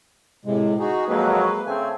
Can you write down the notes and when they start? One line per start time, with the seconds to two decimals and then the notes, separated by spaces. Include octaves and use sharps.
0.45 A2 C3 G#3
0.79 D#4 F#4 G#4
1.08 F2 F#3 G#3 A#3 B4
1.66 C#3 A3 C4 G#5